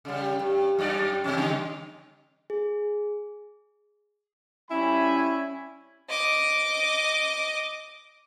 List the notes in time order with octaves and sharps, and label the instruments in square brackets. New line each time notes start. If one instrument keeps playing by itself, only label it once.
[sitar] C#3 G3
G2
F#2 D5
B2 D#3 C#4
C#3 G3
[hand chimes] G#4
[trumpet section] G3 G#5 B5 [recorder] C#4 [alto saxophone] E4
[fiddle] D#5 D6